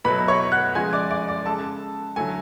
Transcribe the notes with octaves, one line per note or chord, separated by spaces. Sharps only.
B2 F#3 A3 B4 B5
C#5 C#6
F#5 F#6
C#3 F3 G#3 G#5 G#6
D5 D6
D5 D6
D5 D6
C#3 G#3 A4 A5
D3 F#3 A3 G#5